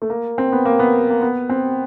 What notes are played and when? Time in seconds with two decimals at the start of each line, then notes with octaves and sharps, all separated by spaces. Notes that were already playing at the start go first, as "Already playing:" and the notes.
0.02 A3
0.10 A#3
0.38 C4
0.52 B3
0.65 A#3
0.79 B3
1.10 A#3
1.22 B3
1.50 C4